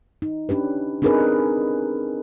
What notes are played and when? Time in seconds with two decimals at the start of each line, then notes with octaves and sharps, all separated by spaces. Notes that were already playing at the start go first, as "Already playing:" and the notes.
0.22 D#4
0.49 C#4 D4 G4 B4
1.02 C4 D4 D#4 G#4 A#4 B4